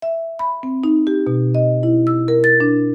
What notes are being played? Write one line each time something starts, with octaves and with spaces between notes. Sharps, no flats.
E5
B5
C4
D#4
G4
B2
D#5
E4
E6
A#4
A6
D4